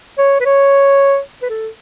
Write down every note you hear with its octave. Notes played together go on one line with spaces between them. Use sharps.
C#5
B4
C#5
B4
A4